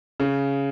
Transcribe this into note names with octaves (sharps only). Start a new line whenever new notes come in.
C#3